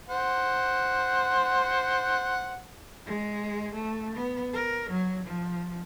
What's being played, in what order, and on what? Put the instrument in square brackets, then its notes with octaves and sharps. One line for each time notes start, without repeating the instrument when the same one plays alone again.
[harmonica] C5 F#5
[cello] G#3
A3
B3
A#4
F#3
F3